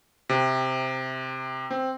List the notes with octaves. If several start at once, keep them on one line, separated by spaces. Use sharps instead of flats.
C3
C4